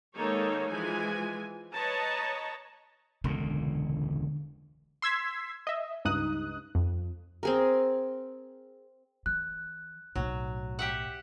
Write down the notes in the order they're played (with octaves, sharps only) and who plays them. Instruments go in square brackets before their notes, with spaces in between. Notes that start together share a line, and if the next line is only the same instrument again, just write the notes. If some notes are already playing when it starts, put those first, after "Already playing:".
[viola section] D#3 G#3 A#3 D#4 A4 C#5
E3 F3 G#3 G#5
B4 C#5 D#5 A5 A#5
[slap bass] E1 C#2 A#2 [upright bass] D3
[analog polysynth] C6 E6 G#6 B6
D#5 E5
C#2 G2 D#4 D#6 F#6
F2
[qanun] C4 G#4 A#4
[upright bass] E3 [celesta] F#6
[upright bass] B1 A2 [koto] F#3
[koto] G4 E5 F#5